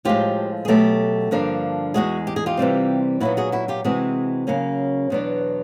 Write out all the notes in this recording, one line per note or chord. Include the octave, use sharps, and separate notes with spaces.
A2 F3 G#3 F4 G4
G#4
B2 F#3 A3 G4 A4
G2 D3 F3 A#3 D4
E2 B2 G#3 F#4 G#4
G4
G#4
F4 G4
C3 E3 G3 C4
A#2 F#3 B3 E4 F#4
F#4 G#4
E4 F#4
F4 G4
C3 E3 G#3 C4 F#4 G#4
C#3 F#3 A#3 C#4
E2 B2 F#3 B3 D4